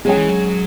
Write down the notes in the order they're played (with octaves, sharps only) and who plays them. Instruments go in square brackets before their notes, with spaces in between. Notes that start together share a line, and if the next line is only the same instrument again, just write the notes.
[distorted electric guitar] F#3 [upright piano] G#3 C#4 G#4
[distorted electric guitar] E3
F#3